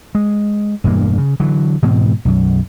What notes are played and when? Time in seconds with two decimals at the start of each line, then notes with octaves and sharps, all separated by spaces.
0.15 G#3
0.84 E1 G2 E3 A#3
1.18 C#3
1.40 D3 E3 F#3
1.82 G#2 B2 E3 C4
2.25 B1 F#2